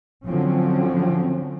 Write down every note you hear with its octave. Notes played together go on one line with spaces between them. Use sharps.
D3 F3 F#3 C4 C#4